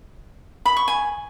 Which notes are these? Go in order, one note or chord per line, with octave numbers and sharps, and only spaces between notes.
B5
C#6
G#5